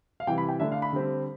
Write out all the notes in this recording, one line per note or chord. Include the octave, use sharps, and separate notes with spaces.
F5
C3 E3 G3 G5
B5
G5
D3 A3 D4 E5
F5
B5
D3 G3 C4